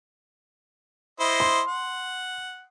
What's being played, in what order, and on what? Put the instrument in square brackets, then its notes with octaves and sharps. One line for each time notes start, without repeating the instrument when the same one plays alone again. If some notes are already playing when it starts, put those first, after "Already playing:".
[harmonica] E4 C5 D#5
[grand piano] C6
[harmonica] F#5